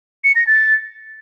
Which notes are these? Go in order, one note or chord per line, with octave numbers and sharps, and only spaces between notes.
C#7
A#6
A6